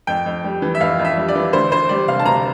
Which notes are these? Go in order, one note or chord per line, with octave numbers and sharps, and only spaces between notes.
F2 G5
F2
G3
E3
E5
F2 F5
F2
E5
G3
D5
E3
D2 C5
D2 C5
G3 D5
C3 F5
A5
D2 A#5